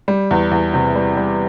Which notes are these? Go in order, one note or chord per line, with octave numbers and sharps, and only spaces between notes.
G3
E2
E2
C3
G3
G3